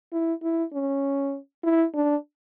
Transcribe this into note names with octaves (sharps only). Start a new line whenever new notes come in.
E4
E4
C#4
E4
D4